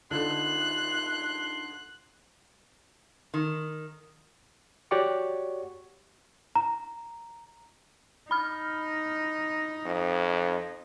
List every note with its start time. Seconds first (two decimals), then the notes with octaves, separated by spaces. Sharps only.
0.11 D3 D#4 F4 C6 F#6
3.34 D#3
4.91 F#4 G4 C#5 D5 F#5 C#6
6.56 A#5
8.31 D#4 B5 F6
9.86 F2